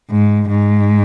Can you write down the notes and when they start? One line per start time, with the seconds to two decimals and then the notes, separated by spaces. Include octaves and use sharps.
0.10 G#2
0.50 G#2